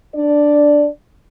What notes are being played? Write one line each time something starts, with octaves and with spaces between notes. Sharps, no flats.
D4 D5